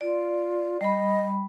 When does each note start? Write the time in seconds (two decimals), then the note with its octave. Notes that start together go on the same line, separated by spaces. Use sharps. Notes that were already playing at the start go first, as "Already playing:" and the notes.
0.01 F4 D5
0.81 G3 D#5 B5